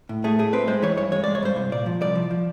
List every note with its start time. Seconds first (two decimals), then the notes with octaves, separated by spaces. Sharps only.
0.09 A2
0.24 A3 G#4
0.39 A2 G#4
0.53 C4 B4
0.67 G#3 C5
0.82 E3 C#5
0.97 G2 C#5
1.12 G#3 C#5
1.24 G#3 D5
1.35 C#5
1.43 G2 C5
1.56 C2
1.72 A#2 D5
1.86 F3
2.01 C2 D5
2.15 F3
2.31 F3